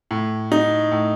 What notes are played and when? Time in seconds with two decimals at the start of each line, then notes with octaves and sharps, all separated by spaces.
0.11 A2
0.52 D#4
0.92 A2